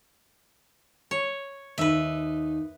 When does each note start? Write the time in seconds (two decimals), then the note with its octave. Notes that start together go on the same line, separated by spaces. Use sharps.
1.11 C#5
1.78 D#2 D#4 B4 E5